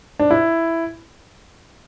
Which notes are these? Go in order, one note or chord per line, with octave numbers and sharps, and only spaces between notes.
D4
E4